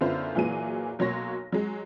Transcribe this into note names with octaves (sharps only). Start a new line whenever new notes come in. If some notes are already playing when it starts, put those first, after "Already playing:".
F#2 D3 B3 E4 F4 C5
A#2 E3 F#3 G#4 D#7
B1 F#3 A#3 C#5 C6 A#6
F#3 G#3